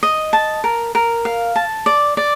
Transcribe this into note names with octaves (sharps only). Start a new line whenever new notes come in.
D#5
A5
A#4
A#4
F5
A5
D5
D5